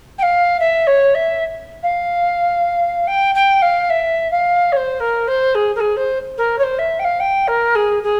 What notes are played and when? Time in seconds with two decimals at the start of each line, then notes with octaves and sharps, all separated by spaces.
0.18 G5
0.22 F5
0.60 E5
0.87 C#5
1.14 E5
1.83 F5
3.07 G5
3.35 G5
3.62 F5
3.90 E5
4.31 F5
4.72 C#5
4.76 C5
5.00 A#4
5.27 C5
5.55 G#4
5.75 A#4
5.80 G#4
5.96 C5
6.37 A#4
6.58 C#5
6.63 C5
6.78 E5
6.99 G5
7.04 F5
7.20 G5
7.47 A#4
7.75 G#4
8.03 G#4